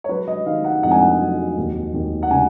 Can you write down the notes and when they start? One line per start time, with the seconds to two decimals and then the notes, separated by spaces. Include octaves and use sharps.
0.04 C#5
0.09 F#3 B4
0.27 D#5
0.46 D#3 F5
0.64 F#5
0.83 F2 F#5
0.91 G#5
1.01 F#5
1.21 F#3
1.58 D#2
1.93 D#2
2.23 F#5
2.31 C#3 G#5